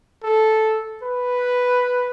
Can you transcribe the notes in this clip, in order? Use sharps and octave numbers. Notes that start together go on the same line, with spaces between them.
A4
B4